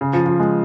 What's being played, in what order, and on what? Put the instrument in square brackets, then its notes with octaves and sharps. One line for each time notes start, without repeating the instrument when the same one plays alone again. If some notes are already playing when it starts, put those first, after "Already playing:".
[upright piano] C#3
F3
F3
G#3